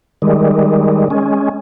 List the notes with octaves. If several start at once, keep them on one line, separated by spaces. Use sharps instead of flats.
D#3 G3 G#3
G#3 C#4